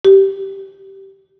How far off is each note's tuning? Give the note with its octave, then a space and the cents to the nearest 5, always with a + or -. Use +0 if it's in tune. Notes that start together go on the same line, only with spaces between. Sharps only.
G4 -10